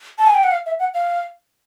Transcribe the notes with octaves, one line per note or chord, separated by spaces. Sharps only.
A5
G#5
G5
F#5
F5
E5
F#5
F5